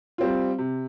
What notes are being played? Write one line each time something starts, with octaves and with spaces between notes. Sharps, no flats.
G3 C4 F4
C3